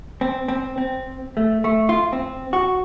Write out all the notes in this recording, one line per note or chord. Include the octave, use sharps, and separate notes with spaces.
C4
C4
C4
A3
A3
F4
C4
F#4